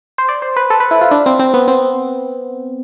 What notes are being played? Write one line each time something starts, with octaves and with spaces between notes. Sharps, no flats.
C5
D5
C5
B4
A4
B4
E4
F4
D4
C4
C4
B3
C4